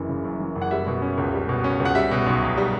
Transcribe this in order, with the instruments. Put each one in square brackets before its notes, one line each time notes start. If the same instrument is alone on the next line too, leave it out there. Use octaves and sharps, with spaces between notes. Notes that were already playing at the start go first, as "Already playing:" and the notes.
Already playing: [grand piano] F#1 F#2 E3
C#3
F#2
E3
F#1
F#5
G3 E5
B2
C#4
C#2
G3
B2
C#4
C#2
F#5
G3 E5
B2
B1
B1
G3